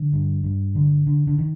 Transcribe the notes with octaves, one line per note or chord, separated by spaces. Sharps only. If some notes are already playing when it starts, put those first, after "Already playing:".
Already playing: D3
G2
G2
D3
D3
D3
D#3